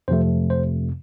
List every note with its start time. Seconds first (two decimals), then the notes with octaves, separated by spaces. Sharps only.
0.08 F2 C3 F3 A3 C5
0.50 C5